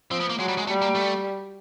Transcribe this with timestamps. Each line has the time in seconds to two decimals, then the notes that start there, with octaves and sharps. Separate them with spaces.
0.11 F3 C4
0.20 B3
0.30 A#3
0.39 F#3 G#3
0.48 G3
0.58 G#3
0.67 G3 A3
0.82 A#3
0.95 A3